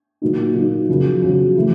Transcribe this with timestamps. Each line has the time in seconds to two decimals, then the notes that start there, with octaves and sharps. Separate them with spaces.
0.22 A#2 F#3 A#3 D#4
0.55 A#2 F#3 A#3 D#4
0.89 F2 C#3 F#3
1.22 F2 C#3 F#3
1.57 E3 A3